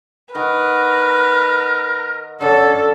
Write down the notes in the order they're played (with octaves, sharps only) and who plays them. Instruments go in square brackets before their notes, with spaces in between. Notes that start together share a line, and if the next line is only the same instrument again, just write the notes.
[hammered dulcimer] D#3 F#5 [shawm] A#4 [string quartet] B4
[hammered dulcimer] D3 C#4 [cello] A4